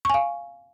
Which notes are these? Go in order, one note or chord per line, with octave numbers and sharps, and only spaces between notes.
F5 G#5 C#6